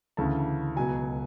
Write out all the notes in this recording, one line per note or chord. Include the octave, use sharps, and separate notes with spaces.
D2 C#3 E3 A5
C#2 B2 F#3 G#5